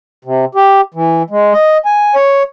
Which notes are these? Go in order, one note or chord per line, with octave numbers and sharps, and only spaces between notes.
C3
G4
E3
G#3
D#5
G#5
C#5